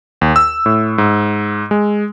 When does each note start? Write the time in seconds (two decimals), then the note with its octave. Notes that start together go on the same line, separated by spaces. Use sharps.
0.21 D#2
0.36 E6
0.66 A2
0.98 G#2
1.71 G#3